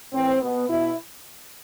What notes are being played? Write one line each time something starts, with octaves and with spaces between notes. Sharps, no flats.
A2 E3 C4
B2 B3
B2 E4